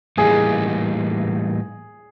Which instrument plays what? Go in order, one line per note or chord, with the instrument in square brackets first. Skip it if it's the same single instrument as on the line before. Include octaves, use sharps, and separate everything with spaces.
[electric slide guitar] A2 E3 G3 A#3 D#4 [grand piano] G#4